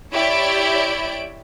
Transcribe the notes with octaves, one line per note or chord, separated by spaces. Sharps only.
E4 G4 C#5 D5 E5 D7